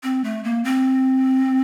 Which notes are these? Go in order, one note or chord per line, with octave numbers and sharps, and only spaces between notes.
C4
A3
A#3
C4